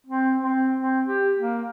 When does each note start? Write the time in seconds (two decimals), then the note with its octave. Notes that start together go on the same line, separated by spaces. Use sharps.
0.06 C4
0.40 C4
0.80 C4
1.07 G4
1.38 A#3